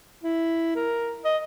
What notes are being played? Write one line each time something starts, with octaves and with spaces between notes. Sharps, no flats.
E4
A#4
D#5